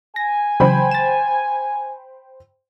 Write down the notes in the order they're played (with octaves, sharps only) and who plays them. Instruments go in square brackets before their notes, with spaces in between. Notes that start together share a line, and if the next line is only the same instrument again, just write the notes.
[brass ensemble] G#5 [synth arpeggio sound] A#6
[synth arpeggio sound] C#3 E3 F#3 [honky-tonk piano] C5 G5 B5
[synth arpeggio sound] A6 E7